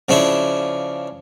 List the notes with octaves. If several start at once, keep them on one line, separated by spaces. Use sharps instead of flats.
C#3 F3 D4 E4